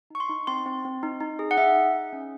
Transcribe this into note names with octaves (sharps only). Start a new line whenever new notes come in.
D#4 C#6
C6
D#4
C4 C6
C4
C4
D#4
D#4
G#4
F#5
D#4 E5
D#4
G#4
C#4